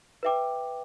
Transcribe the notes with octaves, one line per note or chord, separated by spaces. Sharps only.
B4 E5 G5 D6